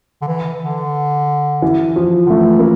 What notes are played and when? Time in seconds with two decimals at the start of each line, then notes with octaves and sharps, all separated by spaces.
0.22 D3
0.28 E3
0.61 D3
1.62 E3
1.96 F3
2.26 D3
2.30 E3 A3
2.59 A#3